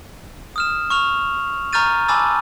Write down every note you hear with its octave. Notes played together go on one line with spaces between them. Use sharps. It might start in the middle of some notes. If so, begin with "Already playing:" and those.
D#6 F6 E7
C#6 F6 F7
A#5 C#6 F6 G6 A6 D#7
G#5 A5 B5 D6 E6 A6